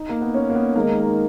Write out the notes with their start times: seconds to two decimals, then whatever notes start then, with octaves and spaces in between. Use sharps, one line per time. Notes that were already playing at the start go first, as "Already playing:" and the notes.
Already playing: D#4
0.09 A#3
0.21 B3
0.34 C#4
0.50 A#3
0.55 B3
0.75 D#3 G#3 A#3 D#4 A#4